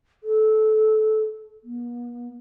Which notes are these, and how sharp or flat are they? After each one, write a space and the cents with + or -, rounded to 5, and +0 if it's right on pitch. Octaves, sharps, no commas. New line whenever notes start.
A4 -20
B3 -45